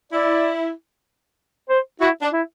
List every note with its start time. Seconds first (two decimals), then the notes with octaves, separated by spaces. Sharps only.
0.12 E4 D5
1.69 C5
2.01 E4 F#4
2.22 D4
2.32 E4